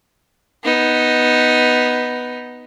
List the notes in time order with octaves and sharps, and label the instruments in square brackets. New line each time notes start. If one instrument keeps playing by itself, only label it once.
[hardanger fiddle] B3 D#4